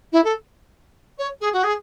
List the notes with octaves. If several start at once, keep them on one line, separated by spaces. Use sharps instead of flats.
E4
A4
C#5
G#4
F#4
G#4